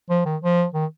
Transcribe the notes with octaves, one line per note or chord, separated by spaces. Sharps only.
F3
D#3
F3
D#3